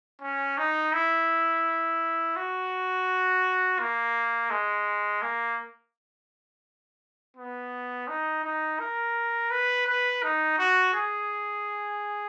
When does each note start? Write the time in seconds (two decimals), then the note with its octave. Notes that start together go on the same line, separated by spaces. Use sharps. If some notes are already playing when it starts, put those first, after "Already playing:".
0.22 C#4
0.58 D#4
0.93 E4
2.36 F#4
3.80 A#3
4.51 G#3
5.22 A#3
7.37 B3
8.08 D#4
8.44 D#4
8.80 A#4
9.51 B4
9.87 B4
10.23 D#4
10.59 F#4
10.94 G#4